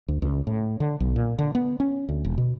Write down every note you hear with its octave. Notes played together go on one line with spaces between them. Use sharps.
D2
C#2
A2
D3
B1
A#2
D3
B3
C#4
D2
E1
B2